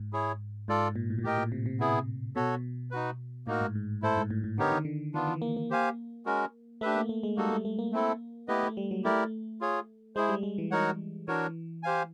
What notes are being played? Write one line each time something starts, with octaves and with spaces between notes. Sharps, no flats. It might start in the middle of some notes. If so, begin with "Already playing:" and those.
Already playing: G#2
E4 G#4 C#5
G#2 F4 A4 D5
A#2
A2
A#2
A2 G4 A#4 D#5 G5
A#2
C3
C3
B3 E4 G#4
B2 F#4 A4 C#5
D#4 F#4 B4
A2 A#3 D#4 F#4 A#4
G#2
G#2
A2 E4 A4 C5
G#2
A2
A2
D3 B3 D#4 G4 A#4 C#5
D#3
D3
D#3 B3 D4 F4
E3
A#3
A#3
G4 C5 F5 G#5
G#3 C#4 F#4 A#4
A3 D4 G4 B4 E5
A#3
A3
G#3
G3 A#3 D#4 F#4 A4
A3
A3
A#3
A3 C4 E4 A4
A3 B3 E4 G4 B4 D#5
A3
G3
F#3
A3 E4 G4 A#4 D5
F4 G#4 C#5
G#3 E4 G#4 C5
G3
G#3
E3
D#4 F#4 A#4 C#5 F#5
E3 D4 F#4 A#4 C#5
G4 C5 F5 G#5